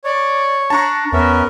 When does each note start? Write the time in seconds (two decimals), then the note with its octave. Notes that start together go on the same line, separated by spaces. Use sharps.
0.04 C#5 D5
0.70 D4 A5 A#5 C#6
1.12 E2 B3 C#4 A#4 E5